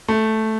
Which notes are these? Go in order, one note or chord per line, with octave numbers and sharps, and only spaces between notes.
A3